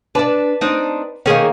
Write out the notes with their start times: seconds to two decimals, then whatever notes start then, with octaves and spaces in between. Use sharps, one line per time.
0.15 D4 B4 D5 A5
0.61 C4 D4 D#4
1.26 D#3 A#3 C#4 G#4 D#5